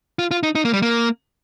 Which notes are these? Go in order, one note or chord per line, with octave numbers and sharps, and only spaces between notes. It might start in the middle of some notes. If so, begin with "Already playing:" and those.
F4
F4
D#4
D#4
A#3
G3
A#3